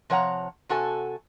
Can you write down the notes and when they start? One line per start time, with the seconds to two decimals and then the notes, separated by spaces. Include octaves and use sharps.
0.10 C3 F3 C#5 F#5 A#5
0.69 C3 F#4 A4 G#5